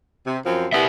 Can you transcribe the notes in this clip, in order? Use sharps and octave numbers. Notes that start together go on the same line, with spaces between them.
C3
F#2 F3 C4
B3 G4 D5 E5